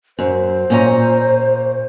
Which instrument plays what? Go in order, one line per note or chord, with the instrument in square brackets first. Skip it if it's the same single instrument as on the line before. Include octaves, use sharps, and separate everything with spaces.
[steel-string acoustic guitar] F#2 [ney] C5
[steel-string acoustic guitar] A#2 C#4 A#5